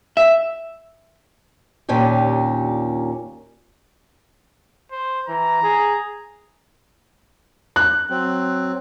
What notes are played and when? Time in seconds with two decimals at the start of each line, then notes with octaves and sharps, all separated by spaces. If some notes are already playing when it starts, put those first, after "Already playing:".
0.17 E5
1.89 D#2 A#2 C#4 D4 G4
4.91 C5
5.28 E3 A#5
5.63 G#4
7.76 F#6
8.10 F#3 C4